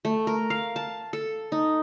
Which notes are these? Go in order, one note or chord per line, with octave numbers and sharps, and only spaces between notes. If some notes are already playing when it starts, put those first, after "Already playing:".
A3
A#4
F5
A5
A4
D#4